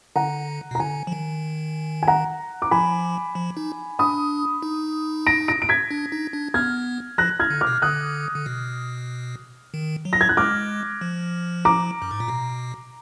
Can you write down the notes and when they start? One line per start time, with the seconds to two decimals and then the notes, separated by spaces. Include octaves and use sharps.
0.16 D3 F#5 A#5
0.71 B2
0.75 A#5
0.80 D3 G#5
1.07 F3
1.12 D#3
2.03 G#5
2.08 F#5 A#5
2.62 D6
2.71 F3 G#5 B5
3.35 F3
3.57 D#4
3.99 D4 B5 D#6
4.62 D#4
5.27 A#6 D7
5.48 A#6 D7
5.62 D7
5.69 G#6 B6
5.91 D4
6.12 D#4
6.33 D4
6.54 B3 F6 G#6
7.18 F3 F#6 A#6
7.40 F6 G#6
7.50 D3
7.61 D6 F6
7.67 B2
7.82 D3 D#6 F#6
8.35 D3
8.46 B2
9.74 D#3
10.05 F#3
10.13 A#6
10.21 G#6
10.29 F#6
10.37 G#3 D6 F6
11.01 F3
11.65 A#5 D6
12.02 F#2
12.11 G#2
12.20 A#2
12.28 B2